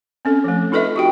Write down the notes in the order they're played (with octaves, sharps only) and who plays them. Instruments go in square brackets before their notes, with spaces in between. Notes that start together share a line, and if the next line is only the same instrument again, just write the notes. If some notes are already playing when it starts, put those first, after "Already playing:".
[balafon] C4 C#4 A4
F3 A3
D#4 F4 A4 B4 D#5 E5
F#4 G4 G5